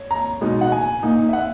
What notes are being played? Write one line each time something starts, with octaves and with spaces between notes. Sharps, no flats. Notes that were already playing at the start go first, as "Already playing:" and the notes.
Already playing: C#5
A#5
B2 G#3 D#4
F#5
G#5
A#2 A#3 D#4
E5
F#5